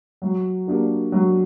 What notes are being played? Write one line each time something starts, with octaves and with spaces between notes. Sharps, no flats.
F#3
A#3 D4 G4
F#3